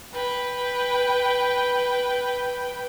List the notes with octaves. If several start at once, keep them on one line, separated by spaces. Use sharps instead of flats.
B4 G5